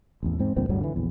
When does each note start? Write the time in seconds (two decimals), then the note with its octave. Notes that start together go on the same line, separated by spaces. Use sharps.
0.23 A1 E2
0.39 G#2 C4
0.56 C#2 G2 A#2 C4
0.69 D1 G2 D3 F#3
0.81 D3 E3
0.96 A#1 E2